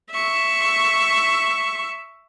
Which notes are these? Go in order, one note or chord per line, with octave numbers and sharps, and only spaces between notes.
E5 C#6